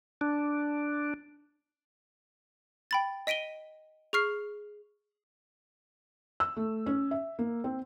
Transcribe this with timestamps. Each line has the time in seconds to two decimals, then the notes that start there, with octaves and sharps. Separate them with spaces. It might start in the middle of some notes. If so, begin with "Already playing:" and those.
0.21 D4
2.91 G5 B5 A6
3.27 D#5 B6 D7 D#7 G7
4.13 G#4 C#6 F6 C7
6.40 E6
6.57 A3
6.86 C#4
7.11 E5
7.39 A#3
7.64 C4